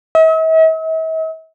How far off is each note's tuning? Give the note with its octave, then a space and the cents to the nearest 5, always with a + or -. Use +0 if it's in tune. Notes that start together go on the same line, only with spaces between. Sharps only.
E5 -45